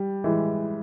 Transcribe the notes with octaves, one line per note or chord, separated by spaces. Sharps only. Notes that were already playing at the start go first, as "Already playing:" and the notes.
Already playing: G3
E3 G#3